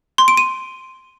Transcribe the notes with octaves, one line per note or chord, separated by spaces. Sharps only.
C6
D7
D#7